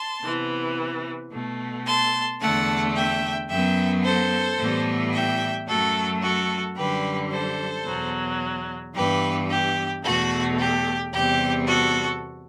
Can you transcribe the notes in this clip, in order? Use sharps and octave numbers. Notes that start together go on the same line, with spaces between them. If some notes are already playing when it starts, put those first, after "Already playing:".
Already playing: A5 C6
C3 E3 B3
B2 A3
A5 C6
E2 D3 A3 F#5 A5
E5 G5
F#2 F#3 B3 E5 G5
A4 C5
A2 E3 G3 B3
E5 G5
F#2 F#3 A3 F#4 A4
F#4 A4
F#2 D3 G3 G4 B4
A4 C5
E2 B2 F#3
G2 E3 B3 G4 B4
G4
E2 B2 A3 F#4
G4
E2 C3 G3 B3 G4
F#4 A4